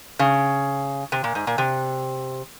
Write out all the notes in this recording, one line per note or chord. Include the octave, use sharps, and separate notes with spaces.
C#3
C3
A#2
G#2
A#2
C3